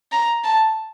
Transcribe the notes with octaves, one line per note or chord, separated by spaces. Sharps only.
A#5
A5